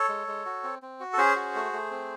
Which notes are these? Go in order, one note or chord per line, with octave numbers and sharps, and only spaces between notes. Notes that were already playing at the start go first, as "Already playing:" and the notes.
Already playing: A4 C#5
G#3
G#3
F#4
C4
C4
F#4
A4
C#4 G#4 C5
F#4
A3
A3
C4